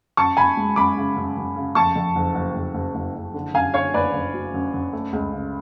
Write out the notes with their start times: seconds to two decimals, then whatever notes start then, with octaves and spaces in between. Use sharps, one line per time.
0.17 F#2 A5 C#6
0.37 F#2 G#5 B5
0.57 G#3
0.76 F#2 B5 D6
0.97 C#3
1.16 F#2
1.37 F#2
1.56 C#3
1.75 F2 A5 C#6
1.96 F2
2.16 F#1
2.35 F#1
2.56 F#1
2.74 F#1
2.95 F#1
3.15 F#1
3.34 D3
3.54 F#2 F5 G#5
3.74 D3 C#5 F5
3.94 F#1 B4 D5
4.14 F#1
4.34 F#3
4.54 F#2
4.74 F#2
4.93 A3
5.13 C#2
5.32 C#3